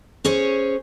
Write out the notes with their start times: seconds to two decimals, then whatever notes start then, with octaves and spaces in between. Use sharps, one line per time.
0.25 C#4 G#4 C5 C#5